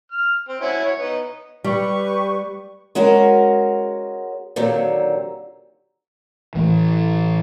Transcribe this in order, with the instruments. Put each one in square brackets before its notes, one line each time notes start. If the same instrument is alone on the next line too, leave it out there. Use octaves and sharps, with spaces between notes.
[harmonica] F6
C4
C#4 E4 F#4
C#5
B3 D#4
[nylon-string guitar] G3 [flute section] G4 B4 C#6
[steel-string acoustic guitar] G#3 C#4 F#4 A#4
A#2 D3 D#3 F#3 C4 G4
[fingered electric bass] A2 E3